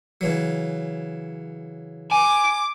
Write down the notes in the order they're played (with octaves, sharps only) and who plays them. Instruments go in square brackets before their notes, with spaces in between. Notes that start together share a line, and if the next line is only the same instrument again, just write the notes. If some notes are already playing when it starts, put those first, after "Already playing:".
[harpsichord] C#3 E3 F#3
[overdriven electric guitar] G#5 [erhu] D6